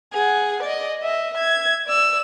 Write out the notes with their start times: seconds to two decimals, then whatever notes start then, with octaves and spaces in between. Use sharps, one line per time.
0.13 G#4 F#5
0.63 D5 D#5
0.99 D#5 E5
1.34 E5 G#6
1.87 D5 E6